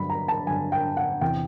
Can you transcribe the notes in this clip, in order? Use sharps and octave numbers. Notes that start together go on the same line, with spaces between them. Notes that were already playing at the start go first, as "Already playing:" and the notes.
Already playing: G2 D3 F#3 B5
A#5
A5
G2 D3 F#3 G#5
G5
F#5
E2 C3 E3 G5